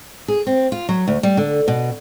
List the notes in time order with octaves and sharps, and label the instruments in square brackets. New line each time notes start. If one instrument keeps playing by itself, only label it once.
[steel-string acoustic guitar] G#4
C4
F4
F#3
D2
G3
D3
B2